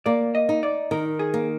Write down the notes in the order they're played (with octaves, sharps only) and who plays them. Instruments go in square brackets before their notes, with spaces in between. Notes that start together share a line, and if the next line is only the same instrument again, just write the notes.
[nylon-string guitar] A#3 [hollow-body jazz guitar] D5
[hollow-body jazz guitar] D#5
[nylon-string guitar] D#4
[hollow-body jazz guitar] D5
[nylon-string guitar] D#3 [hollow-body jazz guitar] A#4
[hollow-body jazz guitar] G#4
[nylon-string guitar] A#3